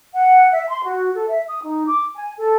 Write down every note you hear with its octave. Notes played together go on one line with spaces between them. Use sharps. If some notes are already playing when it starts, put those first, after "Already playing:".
F#5
E5
C6
F#4
A4
E5
D#6
D#4
D6
G#5
A4